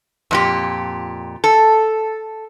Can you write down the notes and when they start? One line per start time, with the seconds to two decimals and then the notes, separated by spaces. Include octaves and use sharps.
0.31 F2 A#2 G4
1.44 A4